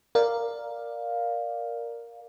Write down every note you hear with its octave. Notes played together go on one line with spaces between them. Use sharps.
A#4 D5 F5